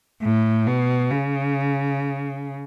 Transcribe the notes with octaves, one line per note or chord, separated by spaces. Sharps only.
A2
B2
C#3